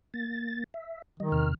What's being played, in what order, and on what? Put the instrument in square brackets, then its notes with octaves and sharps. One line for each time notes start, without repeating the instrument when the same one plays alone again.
[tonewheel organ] A#3 A6
E5
[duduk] D#3 [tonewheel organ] G3 D#5
[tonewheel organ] E2 C3 F6